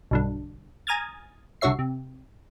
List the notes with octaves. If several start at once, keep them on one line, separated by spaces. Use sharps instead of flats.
B1 G2 D3
G#5 A#5 D#6 F6 G#6 A6
C2 D3 F#4 C#5 E5 C7
C3